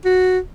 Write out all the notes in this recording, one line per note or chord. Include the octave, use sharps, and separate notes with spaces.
F#4